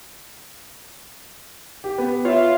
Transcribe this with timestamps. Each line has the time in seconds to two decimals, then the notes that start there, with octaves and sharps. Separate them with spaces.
1.84 G4
1.98 B3
2.25 F4 C#5 E5